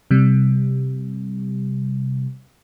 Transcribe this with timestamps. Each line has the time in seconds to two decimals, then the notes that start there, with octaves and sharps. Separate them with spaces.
0.11 C3 G3